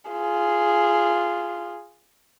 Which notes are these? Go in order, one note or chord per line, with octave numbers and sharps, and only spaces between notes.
F4 G#4